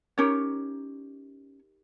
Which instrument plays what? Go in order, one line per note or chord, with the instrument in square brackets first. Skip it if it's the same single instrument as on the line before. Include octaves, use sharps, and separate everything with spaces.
[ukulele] C#4 D#4 G4 A#4 C#5